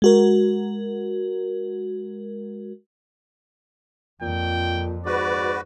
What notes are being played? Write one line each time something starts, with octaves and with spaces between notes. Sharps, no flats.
G#3 F#4 A#4
F2 A#2 G5
G#2 F#4 B4 D5